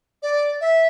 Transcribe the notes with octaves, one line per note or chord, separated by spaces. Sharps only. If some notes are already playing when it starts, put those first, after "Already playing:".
D5
E5